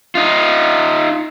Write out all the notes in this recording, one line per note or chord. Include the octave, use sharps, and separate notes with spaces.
D#4 F4